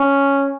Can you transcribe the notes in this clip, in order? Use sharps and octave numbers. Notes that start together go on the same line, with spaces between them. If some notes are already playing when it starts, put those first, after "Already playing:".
Already playing: C#4